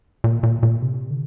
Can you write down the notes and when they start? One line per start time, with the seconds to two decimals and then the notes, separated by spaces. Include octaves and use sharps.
0.24 A#2
0.43 A#2
0.63 A#2
0.82 C3
1.10 D3